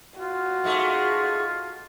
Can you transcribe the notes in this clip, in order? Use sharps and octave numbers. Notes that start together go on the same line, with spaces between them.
F4 F#4
G#2 G#3 A3